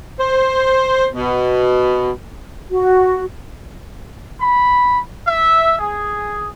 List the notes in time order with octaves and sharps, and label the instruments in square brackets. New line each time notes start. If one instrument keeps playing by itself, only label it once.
[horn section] C5
B2
[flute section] F#4
[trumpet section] B5
E5
G#4